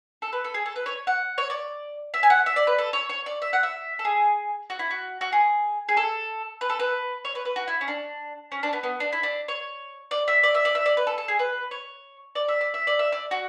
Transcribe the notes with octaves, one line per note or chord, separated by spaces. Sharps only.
A4
B4
A4
G#4
A4
B4
C#5
F#5
C#5
D5
E5
G#5
F#5
E5
D5
B4
A4
C#5
C#5
D5
E5
F#5
E5
A4
G#4
F#4
E4
F#4
F#4
G#4
G#4
A4
B4
A4
B4
C#5
B4
B4
F#4
E4
C#4
D4
C#4
D4
B3
B3
D4
E4
D4
C#5
D5
E5
D5
E5
D5
E5
D5
B4
A4
A4
G#4
B4
C#5
D5
E5
D5
E5
D5
E5
D5
F#4